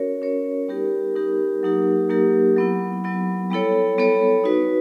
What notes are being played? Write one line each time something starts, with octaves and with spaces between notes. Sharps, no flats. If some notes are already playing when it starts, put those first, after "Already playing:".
Already playing: C#4 F#4 A#4 C#5
C#4 F#4 A#4 C#5
G3 B3 D#4 G4 A#4
G3 B3 D#4 G4 A#4
F#3 A#3 D#4 G4 A#4
F#3 A#3 D#4 G4 A#4
F#3 B3 E4
F#3 B3 E4
G3 B3 E4 A4 C#5
G3 B3 E4 A4 C#5
D#4 F#4 B4